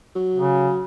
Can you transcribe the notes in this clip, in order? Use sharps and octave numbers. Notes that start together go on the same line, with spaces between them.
F#3
C#3